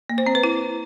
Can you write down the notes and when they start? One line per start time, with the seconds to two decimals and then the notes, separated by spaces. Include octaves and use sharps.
0.09 A#3
0.18 C5
0.27 C4
0.35 B4
0.44 E4